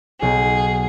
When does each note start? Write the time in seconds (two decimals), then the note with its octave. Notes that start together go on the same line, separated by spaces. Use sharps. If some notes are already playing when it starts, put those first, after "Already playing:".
0.22 B1 G#4